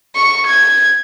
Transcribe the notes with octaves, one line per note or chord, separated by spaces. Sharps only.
C#6
G#6